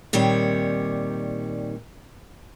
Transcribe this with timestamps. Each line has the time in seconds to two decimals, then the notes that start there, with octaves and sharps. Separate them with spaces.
0.13 A#2 D#3 G3 C4 C#5